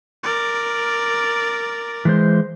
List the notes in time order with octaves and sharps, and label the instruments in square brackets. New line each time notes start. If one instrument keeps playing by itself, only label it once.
[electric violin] A#4 D5
[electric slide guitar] E3 G#3 C5